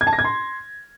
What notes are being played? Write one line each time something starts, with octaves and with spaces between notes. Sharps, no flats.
G#6
A5
A#6
G#6
C6